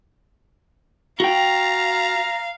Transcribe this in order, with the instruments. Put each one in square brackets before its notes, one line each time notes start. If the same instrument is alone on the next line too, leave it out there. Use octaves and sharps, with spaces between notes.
[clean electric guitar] F#4 G5 [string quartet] F5 [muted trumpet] A#5